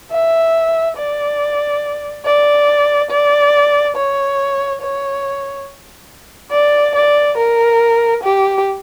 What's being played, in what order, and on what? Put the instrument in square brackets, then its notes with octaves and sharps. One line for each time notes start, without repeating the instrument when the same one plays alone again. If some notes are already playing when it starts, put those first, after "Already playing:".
[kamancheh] E5
D5
D5
D5
C#5
C#5
D5
D5
A#4
G4